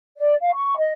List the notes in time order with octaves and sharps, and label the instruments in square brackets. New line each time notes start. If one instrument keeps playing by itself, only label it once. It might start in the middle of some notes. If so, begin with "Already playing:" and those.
[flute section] D5
F5
C#6
D#5